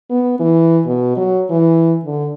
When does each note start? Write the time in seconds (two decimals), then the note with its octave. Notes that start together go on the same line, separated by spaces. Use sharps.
0.10 B3
0.40 E3
0.86 B2
1.17 F#3
1.50 E3
2.05 D3